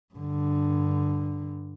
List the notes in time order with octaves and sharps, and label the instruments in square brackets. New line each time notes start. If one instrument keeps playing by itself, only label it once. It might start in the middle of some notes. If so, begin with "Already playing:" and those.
[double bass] G2 D3